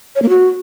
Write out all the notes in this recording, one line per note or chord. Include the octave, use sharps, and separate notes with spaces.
C#5
A#3
F#4